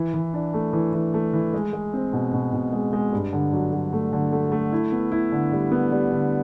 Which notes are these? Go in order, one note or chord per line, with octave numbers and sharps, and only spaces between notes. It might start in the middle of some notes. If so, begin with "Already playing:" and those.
Already playing: E3
E3
D4
A3
E3
E3
A3
E3
G#3
G#3
C4
B2
B2
B2
G#3
G#3
G2
D3
F#3
F#3
A3
D3
A3
A3
E4
B3
E4
D3
G3
B3
G3
D3